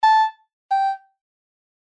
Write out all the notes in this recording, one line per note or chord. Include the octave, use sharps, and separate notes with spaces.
A5
G5